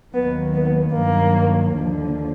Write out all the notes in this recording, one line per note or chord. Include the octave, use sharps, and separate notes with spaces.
D#2 D#3 F#3 B3
B3
G2 D#3 F#3 A#3
D#2 D3 F3